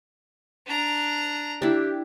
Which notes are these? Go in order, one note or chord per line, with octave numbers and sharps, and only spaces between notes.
D4 A#5
D4 E4 G4